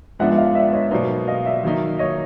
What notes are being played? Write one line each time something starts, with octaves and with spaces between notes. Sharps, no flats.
G#2 F3 G#3 B3 D4 E5 F#5
E5
D#5 F5
D5 E5
C#5 D#5
B2 F#3 A#3 D#4 C5 D5
D#5 F5
D5 E5
D#3 F#3 A#3 D#4
C#5 D#5